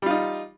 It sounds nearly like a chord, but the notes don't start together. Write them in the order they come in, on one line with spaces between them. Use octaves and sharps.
G3 F4 D#4